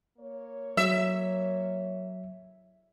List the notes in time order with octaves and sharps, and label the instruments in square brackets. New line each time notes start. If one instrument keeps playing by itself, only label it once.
[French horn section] A#3 C#5
[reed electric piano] F#3 [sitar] E5